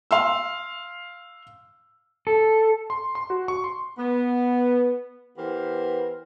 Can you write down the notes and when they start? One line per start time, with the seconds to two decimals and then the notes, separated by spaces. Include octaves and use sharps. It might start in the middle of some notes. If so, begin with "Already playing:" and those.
0.11 F5 C6 E6
2.27 A4
2.90 C6
3.15 C6
3.30 F#4
3.48 C#6
3.64 C6
3.97 B3
5.37 E3 B3 G4 A#4 C5